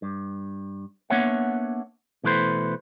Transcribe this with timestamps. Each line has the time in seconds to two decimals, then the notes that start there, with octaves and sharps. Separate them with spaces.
0.02 G2
1.10 A#3 B3 D4 C#5 E5 F#5
2.24 B2 E3 A3 B4 C5